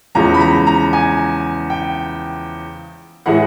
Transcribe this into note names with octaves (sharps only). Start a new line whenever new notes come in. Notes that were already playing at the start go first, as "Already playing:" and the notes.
E2 C#3 F3 G#3 A#5
B5
A#5
A#5
G#5
G5
A2 E3 G#3 F#5